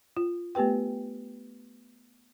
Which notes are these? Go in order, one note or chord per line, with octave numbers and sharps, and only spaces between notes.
F4
A3 B3 G4 B4 G5